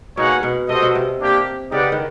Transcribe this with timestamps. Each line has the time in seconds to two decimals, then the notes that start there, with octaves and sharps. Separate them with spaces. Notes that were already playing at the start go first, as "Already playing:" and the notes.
0.17 B2 A#3 D#4 G#4 C#5 F#5
0.43 B2
0.69 C3 F#4 A4 C5 D#5
0.82 B2
0.95 C3
1.20 A#3 D4 G4
1.71 C#3 D#4 G4 B4 D5 F#5
1.92 D#3